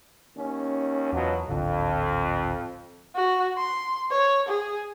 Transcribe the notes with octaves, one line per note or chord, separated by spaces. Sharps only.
D#2 C#4
E2 B2 F3 F#3
D1 G#1 F2 D3
F#4
C6
C#5
G#4